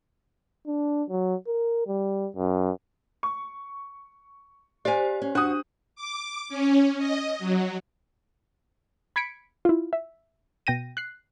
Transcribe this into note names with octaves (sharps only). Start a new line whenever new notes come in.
D4
F#3
A#4
G3
F#2
C#6
G4 C5 D5 G#5
C#4
F2 D4 F#4 F#5 D#6 F#6
D6
C#4
D#5
F#3
B5 G#6 B6 C#7 D7
E4 F4
E5
B2 G5 A#6 D#7
F#6 C7